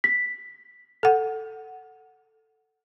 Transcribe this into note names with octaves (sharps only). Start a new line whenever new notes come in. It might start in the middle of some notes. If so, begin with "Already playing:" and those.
B6
A4 F#5